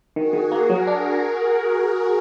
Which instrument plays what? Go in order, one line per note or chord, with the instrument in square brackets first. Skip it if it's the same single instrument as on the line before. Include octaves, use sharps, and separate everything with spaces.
[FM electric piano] D#3 [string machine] F#4 G#4
[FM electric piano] D#3
[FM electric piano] A#3 [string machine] G#4 A#4
[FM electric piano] F#3
D4